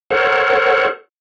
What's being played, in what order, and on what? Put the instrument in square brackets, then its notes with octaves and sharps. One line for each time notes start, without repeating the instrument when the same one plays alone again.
[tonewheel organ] A4 A#4 C5 C#5 F#5